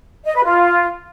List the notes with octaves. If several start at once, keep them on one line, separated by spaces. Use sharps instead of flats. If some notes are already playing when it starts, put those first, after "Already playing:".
D#5
B4
F4